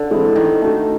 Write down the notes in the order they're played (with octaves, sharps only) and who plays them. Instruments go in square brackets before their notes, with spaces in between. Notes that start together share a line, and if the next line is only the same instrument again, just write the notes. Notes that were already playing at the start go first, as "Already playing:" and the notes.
Already playing: [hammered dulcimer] D3
[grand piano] E3 G#3 C4 E4
[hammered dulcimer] D#3 [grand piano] E3
[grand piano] A3 D4 F#4